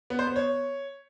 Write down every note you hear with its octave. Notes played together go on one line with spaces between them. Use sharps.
B3
C5
B3
C#5